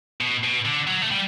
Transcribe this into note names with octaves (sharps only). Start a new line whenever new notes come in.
B2
B2
D3
F#3
A3
G3